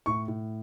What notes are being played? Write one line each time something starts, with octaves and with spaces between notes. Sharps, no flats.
A2 C#6
A2